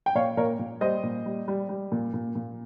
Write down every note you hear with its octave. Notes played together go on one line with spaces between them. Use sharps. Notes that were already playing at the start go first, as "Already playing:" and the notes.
G5
A#2 C#5 F5
A#2 A#4 C#5
A#2
G3 C5 D#5
A#2
G3
G3
G3
A#2
A#2
A#2